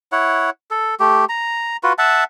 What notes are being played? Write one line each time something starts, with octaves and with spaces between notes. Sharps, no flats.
E4 C#5 F#5
A4
A3 G4
A#5
F4 F#4 B4
E5 F#5 A5